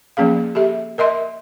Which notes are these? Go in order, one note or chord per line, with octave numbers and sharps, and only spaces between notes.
F3 A#3 C#4 G#4 F5
G4 A4 E5
A#4 D#5 E5 C6